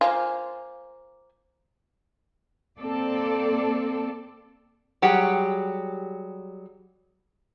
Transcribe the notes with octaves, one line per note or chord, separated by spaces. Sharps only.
A#3 F4 C5 G#5
A#3 C4 A4 D5
F#3 G3 G4 G#4 F#5